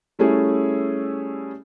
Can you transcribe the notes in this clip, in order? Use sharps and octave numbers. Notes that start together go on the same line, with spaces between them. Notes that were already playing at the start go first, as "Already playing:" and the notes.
G3 A3 C#4 E4 G#4